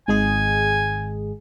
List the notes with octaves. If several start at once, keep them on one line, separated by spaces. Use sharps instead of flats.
G#1 G#3 G#4 G#5